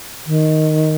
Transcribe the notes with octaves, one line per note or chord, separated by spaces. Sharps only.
D#3